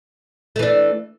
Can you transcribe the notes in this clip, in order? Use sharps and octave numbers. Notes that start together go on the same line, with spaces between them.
E3 A3 D4